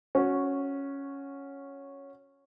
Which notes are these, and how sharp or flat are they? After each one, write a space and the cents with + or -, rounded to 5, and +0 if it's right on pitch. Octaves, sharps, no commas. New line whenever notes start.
C#4 +0 F#4 -10